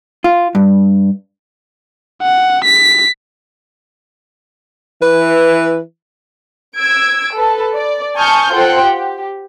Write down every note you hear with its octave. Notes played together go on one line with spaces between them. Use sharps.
F4
G2
F#5
B6
E3 B4
E6 G#6 D7
A4 B4 A5
D5
G#5 A5 C#6 D#6 F6 G6
F4 A4 C5 F#5 G5
G4